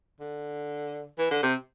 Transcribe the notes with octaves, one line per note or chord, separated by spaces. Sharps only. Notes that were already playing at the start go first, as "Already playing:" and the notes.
D3
E3
D3
C3